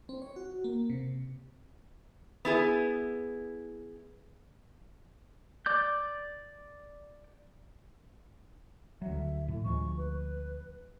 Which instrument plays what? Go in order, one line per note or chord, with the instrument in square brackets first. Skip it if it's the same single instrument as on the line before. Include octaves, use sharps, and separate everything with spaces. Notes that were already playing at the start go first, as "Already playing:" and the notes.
[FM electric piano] C4
C#5
F#4
A#3
C3
[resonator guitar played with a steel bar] B3 E4 G#4
[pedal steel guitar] D5 D6 G6
[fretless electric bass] D2 F#3 [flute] E5
[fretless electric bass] A2
[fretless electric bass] D2 F3 G#3 [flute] C#6
[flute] B4